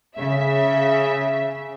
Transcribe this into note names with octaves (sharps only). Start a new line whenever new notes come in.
C#3 E5